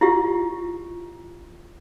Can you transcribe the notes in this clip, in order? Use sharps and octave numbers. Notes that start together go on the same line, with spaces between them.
E4 F4 G4